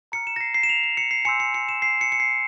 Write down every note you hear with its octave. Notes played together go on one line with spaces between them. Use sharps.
A#5 F6 C#7
E7
A#6
C7
C7
E7
F7
E7
C#7
C7
G#5 C6 E6 G6 C#7
C#7
C#7
E7
C7
C#7
C#7
C7